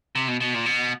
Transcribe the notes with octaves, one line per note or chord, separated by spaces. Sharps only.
C3
B2
B2
A#2
B2